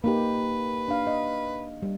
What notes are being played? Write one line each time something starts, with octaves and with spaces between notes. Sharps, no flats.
A#3 D#4 G4 B4
D4 F5
D#5
G3